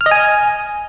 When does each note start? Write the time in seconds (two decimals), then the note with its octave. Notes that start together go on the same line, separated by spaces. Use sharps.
0.01 F6
0.06 D#5
0.11 G#5